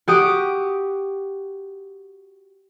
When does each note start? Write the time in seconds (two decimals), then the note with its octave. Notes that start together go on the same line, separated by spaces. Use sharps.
0.08 F#4 G4 D#6 D7